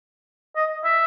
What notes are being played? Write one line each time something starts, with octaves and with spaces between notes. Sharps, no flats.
D#5
E5